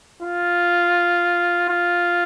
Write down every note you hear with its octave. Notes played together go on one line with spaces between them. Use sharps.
F4
F4